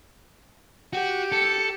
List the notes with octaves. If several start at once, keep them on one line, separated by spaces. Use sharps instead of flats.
F#4 G4
A4 C#7